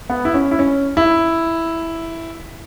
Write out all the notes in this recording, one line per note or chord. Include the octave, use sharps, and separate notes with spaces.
B3
E4
C#4
E4
C#4
E4